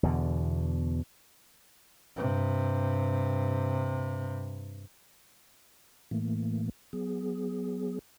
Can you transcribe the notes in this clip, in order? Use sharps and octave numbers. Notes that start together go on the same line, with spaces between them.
E2 B2 D3
G2 C3
A2 E3 A3 A#3
F#3 B3 G#4